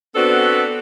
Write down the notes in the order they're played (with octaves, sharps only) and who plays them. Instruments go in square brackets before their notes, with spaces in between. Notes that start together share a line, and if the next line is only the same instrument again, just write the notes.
[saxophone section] B3 C4 D4 F#4 A4